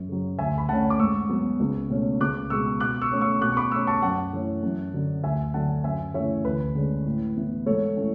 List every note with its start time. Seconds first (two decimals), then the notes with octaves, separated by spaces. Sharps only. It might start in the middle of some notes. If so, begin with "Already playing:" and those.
Already playing: F#2
0.08 C#3 F#3
0.39 D2 E5 G#5
0.58 B5
0.69 D3 A3 C#4 F#5 A5
0.90 D6
0.99 G#2 C#6 E6
1.29 F#3 B3
1.60 C#2
1.90 B2 A3 C#4
2.20 C#2 D6 F#6
2.50 B2 G#3 B3 C#6 E6
2.80 B2 D6 F#6
3.02 C#6 E6
3.12 A3 C#4
3.21 C#6 E6
3.41 B2 D6 F#6
3.52 C#6
3.57 B5 D6
3.72 A3 C#4 C#6 E6
3.87 A5 C#6
4.02 F#2 F#5 A5
4.33 E3 A3 C#4
4.63 F#2
4.93 D3 F#3
5.24 D2 E5 G#5
5.54 D3 F#3 F#5 A5
5.84 F#2 E5 G#5
6.14 C#3 E3 A3 C#4 C#5 E5
6.45 D2 B4
6.75 D3 G#3 C#4
7.06 A2
7.36 E3 B3
7.66 G#2 A4 C#5
7.96 E3 A3 C#4